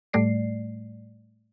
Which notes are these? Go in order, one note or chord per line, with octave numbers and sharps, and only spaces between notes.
A2 G3 A3 D5 C7